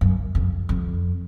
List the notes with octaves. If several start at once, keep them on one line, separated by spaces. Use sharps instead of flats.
F#2
F2
F2